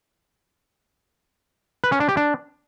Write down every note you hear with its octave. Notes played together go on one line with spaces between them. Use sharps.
B4
C#4
D4
G4
D4